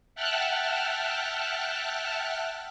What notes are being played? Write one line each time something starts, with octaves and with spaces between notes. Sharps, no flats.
E5 F#5 G5 A5 F6 F#6